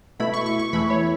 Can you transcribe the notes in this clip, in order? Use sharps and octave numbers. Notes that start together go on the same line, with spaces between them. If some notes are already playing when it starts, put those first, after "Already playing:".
B2 A3 E4 B5
C#6
C#6
C#6
E2 E3 A3 E4 B5
C#5